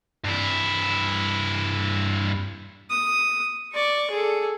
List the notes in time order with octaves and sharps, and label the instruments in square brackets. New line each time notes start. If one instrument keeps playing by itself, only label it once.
[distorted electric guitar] G2 E4
[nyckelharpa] D#6
D5 C#6
G#4 A4